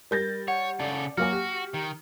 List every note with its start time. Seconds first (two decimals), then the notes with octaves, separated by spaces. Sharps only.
0.11 G3 A#4 G6 A6 A#6
0.48 C#5 F#5
0.80 C#3 A4 D5
1.18 F#3 A#3 F#4 G#5 F6
1.32 G4
1.74 D#3